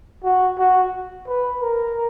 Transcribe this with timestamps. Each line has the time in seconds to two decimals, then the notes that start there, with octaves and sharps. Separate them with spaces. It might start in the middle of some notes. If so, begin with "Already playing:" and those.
0.24 F#4
0.58 F#4
1.27 B4
1.61 A#4